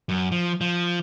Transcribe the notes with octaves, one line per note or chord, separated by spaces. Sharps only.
F#2
F3
F3